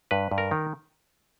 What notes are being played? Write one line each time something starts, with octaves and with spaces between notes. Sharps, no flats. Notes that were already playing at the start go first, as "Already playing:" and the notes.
G2 B4
G2
A#4
D#3